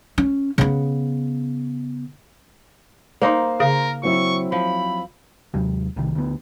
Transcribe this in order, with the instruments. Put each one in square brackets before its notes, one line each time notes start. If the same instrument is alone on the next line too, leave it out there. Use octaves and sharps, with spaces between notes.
[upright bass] C#4
C#3 B3
[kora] A#3 D#4 [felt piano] C5 A#5 C6
[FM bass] C#3 [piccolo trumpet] A#4
[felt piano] F#3 C4 E4 [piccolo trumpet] C#6
[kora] F3 [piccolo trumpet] B5
[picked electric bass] D#2 C3 F#3 G#3
B1 C3 D#3
D2 B3